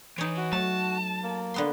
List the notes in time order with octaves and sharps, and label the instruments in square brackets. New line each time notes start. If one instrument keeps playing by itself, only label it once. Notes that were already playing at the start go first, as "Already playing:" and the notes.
[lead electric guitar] E3 [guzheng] D#4 C#5
[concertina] F#4
[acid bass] F#3 [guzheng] A3 [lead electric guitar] A5
[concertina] A#3
[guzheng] D3 B3 C6